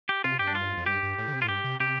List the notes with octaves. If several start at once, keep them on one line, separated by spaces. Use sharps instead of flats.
G4
C3 F4
G2 G4
D4
F4
F2
G2 G4
G2
A2
D3
C3
A2 F4
G2 G4
C3
C3 G4